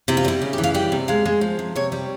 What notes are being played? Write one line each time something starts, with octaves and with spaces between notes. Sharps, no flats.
C3 E4
F4
G3 E4
C#3
G4
E3
F5
G3 G5
C3
G#3 F5
G#3
F3
C3
C3 C#5
G3